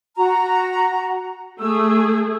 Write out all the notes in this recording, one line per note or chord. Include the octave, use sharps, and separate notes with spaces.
F#4 A#5
A3 G#4 E6